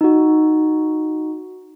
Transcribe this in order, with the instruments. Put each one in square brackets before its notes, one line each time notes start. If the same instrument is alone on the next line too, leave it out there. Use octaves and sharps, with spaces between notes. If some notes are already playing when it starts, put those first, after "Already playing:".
[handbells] D#4 F#4